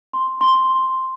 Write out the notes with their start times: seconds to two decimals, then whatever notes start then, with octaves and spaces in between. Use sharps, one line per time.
0.13 C6
0.41 C6